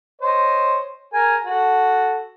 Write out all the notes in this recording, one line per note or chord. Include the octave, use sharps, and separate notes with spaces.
C5 C#5 D#5
G#4 A#4 G#5
F#4 A4